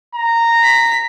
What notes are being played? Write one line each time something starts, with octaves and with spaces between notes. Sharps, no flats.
A#5
B6